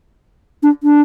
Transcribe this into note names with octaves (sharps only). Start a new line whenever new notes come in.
D4
D4